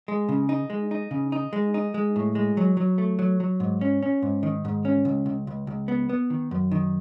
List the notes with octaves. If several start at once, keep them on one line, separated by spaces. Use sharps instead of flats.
G#3
C#3
D#4
G#3
D#4
C#3
D#4
G#3
D#4
G#3
A2
G#3
F#3
F#3
A3
F#3
F#3
G#2
C#4
C#4
G#2
D#3
G#2
C#4
C#2
C#2
C#2
C#2
B3
B3
D#3
F#2
D#3